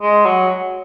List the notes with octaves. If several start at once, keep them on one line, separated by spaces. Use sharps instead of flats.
G#3
F#3